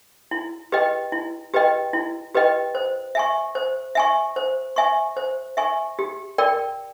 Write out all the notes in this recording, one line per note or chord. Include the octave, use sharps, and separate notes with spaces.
E4
G4 B4 D#5 G5
E4
G4 B4 D#5 G5
E4
G4 B4 D#5 G5
C5
E5 G#5 C#6
C5
E5 G#5 C#6
C5
E5 G#5 C#6
C5
E5 G#5 C#6
G4
A#4 D5 G5